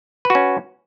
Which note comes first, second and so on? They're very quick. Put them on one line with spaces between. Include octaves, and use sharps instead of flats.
B4 F#4 C#4